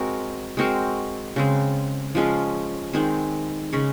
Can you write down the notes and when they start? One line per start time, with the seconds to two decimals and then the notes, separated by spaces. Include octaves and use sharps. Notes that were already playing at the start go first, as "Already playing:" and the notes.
Already playing: G#3 C4 F#4 A#4
0.57 G#3 C4 F#4 A#4
1.36 C#3 G#3 C4
2.15 F3 G#3 C#4 F4
2.93 D#3 G#3 C4
3.73 C#3 G#3 C#4